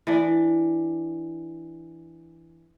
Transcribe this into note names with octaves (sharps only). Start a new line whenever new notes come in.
E3 D4